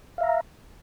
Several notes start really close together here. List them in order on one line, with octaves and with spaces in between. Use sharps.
F5 E5 A#5